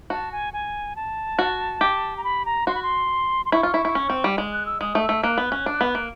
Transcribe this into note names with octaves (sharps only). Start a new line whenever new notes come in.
F#4 A5
G#5
G#5
A5
F#4
G4
A#5
B5
A#5
F#4 C6
B5
C6
C6
E4 C#6
F4
E4
E4
C#4
C4
G3
G#3
F#6
E6
G#3 D#6
A3
E6
A3
A#3 F#6
B3
C#4
D4
B3
A#3